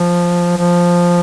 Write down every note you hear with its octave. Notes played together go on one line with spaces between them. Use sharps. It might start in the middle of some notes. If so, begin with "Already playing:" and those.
Already playing: F3
F3